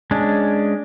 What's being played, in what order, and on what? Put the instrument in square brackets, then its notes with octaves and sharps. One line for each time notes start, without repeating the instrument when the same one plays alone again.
[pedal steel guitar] G#3 C#4 D4